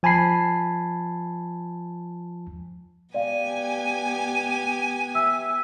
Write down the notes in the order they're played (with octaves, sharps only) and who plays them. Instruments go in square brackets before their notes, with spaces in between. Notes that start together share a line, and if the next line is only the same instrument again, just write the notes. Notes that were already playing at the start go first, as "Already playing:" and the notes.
[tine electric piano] F3 G#5 A5 B5 C7
[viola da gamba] B3 G4 [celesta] D5 F5 [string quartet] G#5
[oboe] E5 [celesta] E6